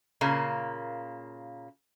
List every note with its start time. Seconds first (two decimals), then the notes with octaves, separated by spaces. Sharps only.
0.21 A#2 C#3 A#3